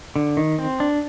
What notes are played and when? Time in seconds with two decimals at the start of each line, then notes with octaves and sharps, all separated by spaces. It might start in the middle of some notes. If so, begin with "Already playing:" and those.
0.16 D3
0.37 D#3
0.59 C4
0.80 D4